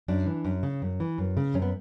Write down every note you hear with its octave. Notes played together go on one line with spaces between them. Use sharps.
F#2 D4
E3
F#2
C#3
F#2
E3
F#2
C#3
F#2 C#4
B3